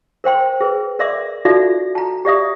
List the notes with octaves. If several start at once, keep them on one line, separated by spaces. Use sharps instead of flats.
A#4 C5 G5 C6
G#4 B4
A#4 D5 E5 C6 D6
D#4 F4 F#4 A4 D5 E5
A5 A#5
G4 D5 E5 D#6